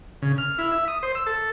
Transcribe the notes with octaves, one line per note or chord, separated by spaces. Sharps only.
C#3
F6
E4
E5
D#6
C5
E6
A4